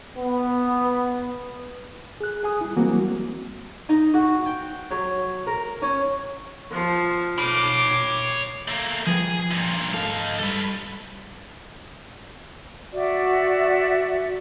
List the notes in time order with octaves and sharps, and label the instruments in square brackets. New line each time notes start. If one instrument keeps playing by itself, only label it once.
[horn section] B3
[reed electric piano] G#4 F#6
G#4 G#5 D#6
G3 E4
E3 F#3 G3 A#3 C4 F#4
[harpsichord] D#4
F#4
G5
F#3
A#4
C#4
[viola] F3
[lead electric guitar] C#5 B5 [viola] D6
[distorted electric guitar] A3 A#3
[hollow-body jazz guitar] F3 B4 G5 [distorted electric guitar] G#4
[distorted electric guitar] G2 A#2
[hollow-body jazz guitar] G#2 A4 [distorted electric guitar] D#4 F5
[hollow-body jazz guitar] G2 [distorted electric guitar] A4 B4
[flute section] F#4 D5 E5